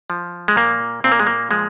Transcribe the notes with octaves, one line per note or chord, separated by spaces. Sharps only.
F3
G#3
A#2 A#3
A#2 C4
A#3
G#3
A#3
F3 G#3